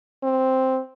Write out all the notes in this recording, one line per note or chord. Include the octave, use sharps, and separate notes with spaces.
C4